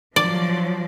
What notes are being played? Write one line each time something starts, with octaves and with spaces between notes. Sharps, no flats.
F3 F#3 D5